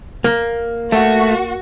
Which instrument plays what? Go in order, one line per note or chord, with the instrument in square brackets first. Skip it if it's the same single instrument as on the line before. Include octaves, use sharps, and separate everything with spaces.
[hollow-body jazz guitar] A#3
[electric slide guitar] A3 [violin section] F#4